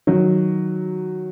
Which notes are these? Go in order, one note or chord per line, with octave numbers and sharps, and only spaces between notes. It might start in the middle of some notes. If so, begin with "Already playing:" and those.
D#3 F#3